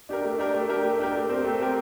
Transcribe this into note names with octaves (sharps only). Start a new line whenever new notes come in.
D4 G4 A#4
A3
D4 G4 A#4
A3
D4 G4 A#4
A3
D4 G4 A#4
A3
C4 G4 A#4
A3
C4 G4 A#4